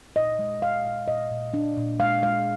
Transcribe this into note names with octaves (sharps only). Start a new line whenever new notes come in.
A#2 D#5
G#3
A#2 F5
A#2
A#2 D#5
A#2
D4
A#2
G#3 F5
G#3 F5